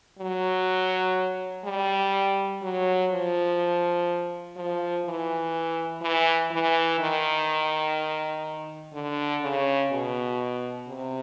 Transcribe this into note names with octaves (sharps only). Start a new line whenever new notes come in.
F#3
G3
F#3
F3
F3
E3
E3
E3
D#3
D3
C#3
B2
C3